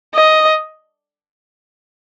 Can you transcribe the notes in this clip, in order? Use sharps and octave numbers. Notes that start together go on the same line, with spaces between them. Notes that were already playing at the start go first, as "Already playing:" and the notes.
D#5